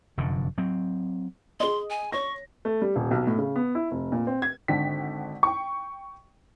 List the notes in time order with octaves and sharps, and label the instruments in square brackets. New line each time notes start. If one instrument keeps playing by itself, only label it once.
[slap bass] F1 F#2 D3
F#3 C4
[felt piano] G#4 D#5 [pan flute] C6
[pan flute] G#5
[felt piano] C#5 A#6 [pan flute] C#6
[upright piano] A3
G3
D#1
B1
A2
C#3
B3
E4
F1
A#2
C4
G#6
[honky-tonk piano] G#1 D3 G5 B6
G5 C#6